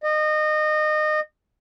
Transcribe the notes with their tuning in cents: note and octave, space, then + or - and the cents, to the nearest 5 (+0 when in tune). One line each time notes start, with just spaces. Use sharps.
D#5 -25